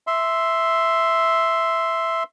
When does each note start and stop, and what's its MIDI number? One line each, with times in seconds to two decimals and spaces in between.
0.07 2.23 76
0.07 2.23 84